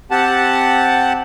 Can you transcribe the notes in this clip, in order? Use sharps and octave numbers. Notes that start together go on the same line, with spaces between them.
C4 G4 F#5 A5